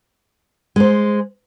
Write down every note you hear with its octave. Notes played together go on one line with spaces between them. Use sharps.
G#3 C5